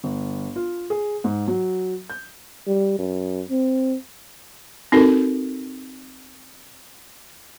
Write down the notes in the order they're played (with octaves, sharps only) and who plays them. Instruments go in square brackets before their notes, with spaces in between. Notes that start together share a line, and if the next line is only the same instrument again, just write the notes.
[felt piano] G1
F4
G#4
G#2
F#3
G6
[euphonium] G3
F#2
C4
[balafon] C4 D#4 F#4 A4 A#4